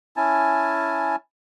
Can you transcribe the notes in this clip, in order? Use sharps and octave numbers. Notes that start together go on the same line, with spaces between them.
C#4 E4 G#5 A5